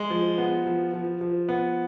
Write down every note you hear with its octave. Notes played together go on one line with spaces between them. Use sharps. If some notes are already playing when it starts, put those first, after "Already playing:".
Already playing: G#3
F3
B3
F3
F3
F3
B3